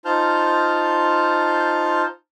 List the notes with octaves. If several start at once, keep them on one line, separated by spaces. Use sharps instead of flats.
D#4 F4 C5 A5 F6 G6